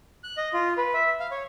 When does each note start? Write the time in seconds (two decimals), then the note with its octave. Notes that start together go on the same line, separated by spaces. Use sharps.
0.24 F#6
0.37 D#5
0.53 F4
0.78 B4
0.94 E5
1.20 F5
1.31 C#5